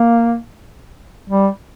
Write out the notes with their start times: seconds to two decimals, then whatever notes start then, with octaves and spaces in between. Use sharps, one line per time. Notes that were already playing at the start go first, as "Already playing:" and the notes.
Already playing: A#3
1.29 G3